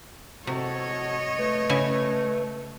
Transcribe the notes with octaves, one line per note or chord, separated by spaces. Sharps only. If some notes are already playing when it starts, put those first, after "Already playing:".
C3 F#4 A4 C#5 D#5
A3 B4
C#3 E4 G#5